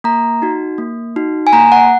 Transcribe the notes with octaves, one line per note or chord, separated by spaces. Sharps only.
A#3 A#5
D#4 F#4
A#3
D#4 F#4
G#5
A#3 A#5
F#5